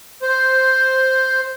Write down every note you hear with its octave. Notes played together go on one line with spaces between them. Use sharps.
C5